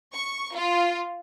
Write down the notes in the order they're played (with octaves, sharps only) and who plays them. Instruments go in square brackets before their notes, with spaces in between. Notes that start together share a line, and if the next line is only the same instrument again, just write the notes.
[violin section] C#6
F4